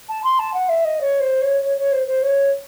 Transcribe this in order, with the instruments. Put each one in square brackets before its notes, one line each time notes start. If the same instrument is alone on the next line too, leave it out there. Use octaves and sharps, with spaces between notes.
[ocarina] A5
C6
A5
F#5
E5
D#5
C#5
C5
C#5
C#5
C#5
C5
C5
C#5